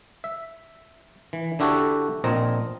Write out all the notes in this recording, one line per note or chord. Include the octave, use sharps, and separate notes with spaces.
E5
E3
D3 D4 E4 F#4 G4 A4
A#1 A#2 C4 D#5 A#5